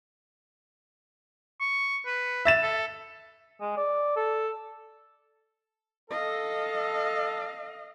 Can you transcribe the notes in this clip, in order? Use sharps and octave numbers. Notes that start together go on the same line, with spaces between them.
C#6
B4
E5 A6 E7
A4
G#3
D5
A4
A4 D#5 F5